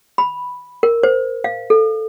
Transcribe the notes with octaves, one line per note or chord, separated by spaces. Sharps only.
B5
A#4
C5
F5
A4